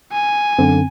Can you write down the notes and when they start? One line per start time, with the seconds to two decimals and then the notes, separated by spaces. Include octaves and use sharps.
0.12 G#5
0.59 F#2 D3 C4